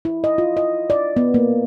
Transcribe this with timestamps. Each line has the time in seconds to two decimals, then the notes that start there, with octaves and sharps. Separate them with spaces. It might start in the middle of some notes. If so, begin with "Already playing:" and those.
0.05 E4
0.24 D#5
0.38 F4
0.57 D#5
0.90 D5
1.17 B3
1.34 A#3